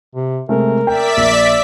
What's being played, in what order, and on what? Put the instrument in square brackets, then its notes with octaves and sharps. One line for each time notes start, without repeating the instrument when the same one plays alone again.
[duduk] C3
[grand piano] C3 G#3 A3 [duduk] A#4
[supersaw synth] D5 E5 B6 [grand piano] G5
[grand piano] A#1